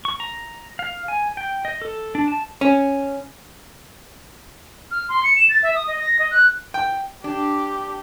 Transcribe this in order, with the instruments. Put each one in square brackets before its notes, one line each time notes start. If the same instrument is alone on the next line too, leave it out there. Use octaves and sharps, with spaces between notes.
[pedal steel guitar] C#6
A#5
F5
G#5
G5
D#5
A4
D4
A5
[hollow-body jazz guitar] C#4
[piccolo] F6
C6
C#7
E7
A6
E5
D#6
D#5
A#6
D#5
F#6
[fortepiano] G5
[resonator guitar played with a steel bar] D4 [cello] G4 [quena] D6